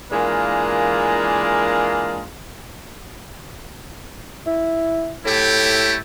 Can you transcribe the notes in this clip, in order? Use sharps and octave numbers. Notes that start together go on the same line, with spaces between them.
E3 G#3 A#3 D4 F4 A#4
E4
A2 A3 E4 G4